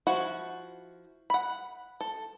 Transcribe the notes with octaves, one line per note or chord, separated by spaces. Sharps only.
F3 E4 F#4 F#5
F#5 B5
A4